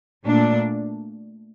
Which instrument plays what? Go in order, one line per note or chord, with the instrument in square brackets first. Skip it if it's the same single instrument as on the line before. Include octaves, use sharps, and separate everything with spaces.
[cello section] A#2 A3 D4